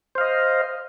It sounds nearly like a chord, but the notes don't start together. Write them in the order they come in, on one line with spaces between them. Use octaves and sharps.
C5 F5 D#5